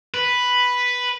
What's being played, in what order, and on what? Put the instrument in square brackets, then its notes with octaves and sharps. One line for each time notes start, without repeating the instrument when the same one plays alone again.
[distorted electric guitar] B4